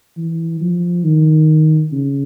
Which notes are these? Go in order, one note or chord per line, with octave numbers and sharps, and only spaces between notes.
E3
F3
D#3
C#3